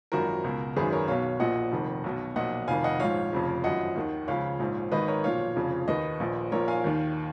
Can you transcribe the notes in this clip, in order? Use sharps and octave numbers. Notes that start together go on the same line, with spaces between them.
G#1 F#2 F3 F#4 A#4
C#2 B2
G#1 F#2 D#3 G#4 B4
A#4 C#5
B1 B2 C#5 F5
A#1 A#2 F3 D#5 F#5
F1 F2 D#3
B1 B2
B1 A#2 F3 D#5 F#5
F1 F2 D#3 F5 G#5
D#5 F#5
A#1 G#2 F3 C#5 F5
F1 F2 C#3 F3
G#1 F#2 F3 D#5 F#5
D#2 D#3
C#2 C#3 F3 C#5 F5
A#1 G#2 F3
G#1 G#2 D#3 B4 D#5
A#4 C#5
B1 A#2 F3 C#5 F5
F1 F2 C#3 F3
D#2 D#3 B4 D#5
A#1 A#2 F3
A#1 A#2 F3 A#4 C#5
F5 G#5
D#2 D#3